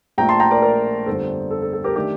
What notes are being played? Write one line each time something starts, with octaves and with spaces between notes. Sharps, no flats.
A#1 A#2 A3 G5 A#5
A5 C6
G5 A#5
A#4 D5
A#4 D5
G1 F2 D3 G3 D4 A4 C5
A4
A4
A4
G4 A#4
D#3 A3 D4 G4